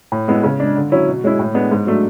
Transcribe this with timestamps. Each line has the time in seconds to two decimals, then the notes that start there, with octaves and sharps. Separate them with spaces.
0.12 A2
0.28 G#3 B3 E4
0.43 C#3
0.60 G#3 D4
0.76 D3
0.92 F#3 C#4 E4
1.07 B2
1.24 G#3 C#4 E4
1.39 A2
1.54 G#3 B3 D4
1.71 G#2
1.87 F#3 A3 D4